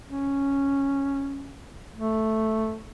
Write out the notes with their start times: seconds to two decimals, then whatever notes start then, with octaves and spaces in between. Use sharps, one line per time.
0.08 C#4
1.95 A3